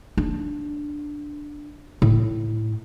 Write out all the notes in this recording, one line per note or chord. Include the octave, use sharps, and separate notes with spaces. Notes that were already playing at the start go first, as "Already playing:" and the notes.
D4
A2